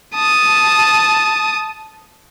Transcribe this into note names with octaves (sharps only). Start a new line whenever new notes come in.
A5 D#6